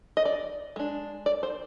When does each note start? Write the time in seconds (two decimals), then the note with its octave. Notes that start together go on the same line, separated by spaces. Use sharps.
0.17 D#5
0.25 D5
0.76 G#3 D4
1.26 D5
1.43 C5